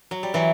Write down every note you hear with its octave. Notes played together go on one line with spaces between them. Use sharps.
F#3
G3
E3 F#3